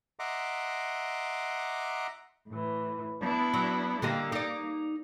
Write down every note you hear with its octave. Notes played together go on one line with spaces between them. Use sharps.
D#5 E5 F#5 A#5 C6 D6
A2 E3
B3 D4 E4
F#3
D3 G3 A#3 D#5
D#4 D5